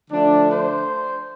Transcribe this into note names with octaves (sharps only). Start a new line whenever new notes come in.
D3 F3 A3 D4
C5